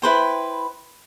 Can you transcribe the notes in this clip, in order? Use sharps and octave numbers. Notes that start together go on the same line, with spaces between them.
E4 B4 C5 G5